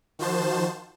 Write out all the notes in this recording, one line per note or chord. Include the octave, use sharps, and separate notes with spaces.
D#3 F3 F#4 C5 A5 E7